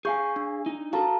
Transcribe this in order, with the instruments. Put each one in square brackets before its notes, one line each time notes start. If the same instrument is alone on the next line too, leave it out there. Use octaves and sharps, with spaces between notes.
[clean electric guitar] G#4 F5 G#5 [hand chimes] C#6 G6
[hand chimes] D4
[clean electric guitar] D#4
[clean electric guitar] F#4 A4 [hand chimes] F5 A5 A#5